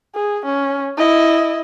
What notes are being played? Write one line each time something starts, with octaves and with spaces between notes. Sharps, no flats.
G#4
C#4
E4 D#5